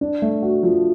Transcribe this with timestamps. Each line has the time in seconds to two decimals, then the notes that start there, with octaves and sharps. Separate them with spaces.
0.01 D4
0.22 A3
0.42 F#4
0.63 F3